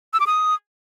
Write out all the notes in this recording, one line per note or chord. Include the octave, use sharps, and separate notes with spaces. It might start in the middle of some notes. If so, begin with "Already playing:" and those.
E6
D6
D#6